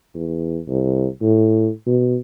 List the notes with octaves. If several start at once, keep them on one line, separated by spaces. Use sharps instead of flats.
E2
C2
A2
B2